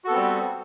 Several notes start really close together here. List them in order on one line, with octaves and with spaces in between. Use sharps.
F#4 A4 B3 C4 G3